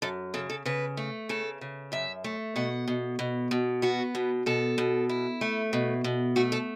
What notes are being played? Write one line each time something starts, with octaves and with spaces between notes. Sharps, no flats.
F#2 A4
C#3 A4
A4
C#3 B4
A3
C#3 A4
C#3
F#2 E5
A3
B2 F#5
B2
B2
B2
B3 F#4
B2
B2 A4
B2
E4
A3
B2
B2
A3 F#4
A4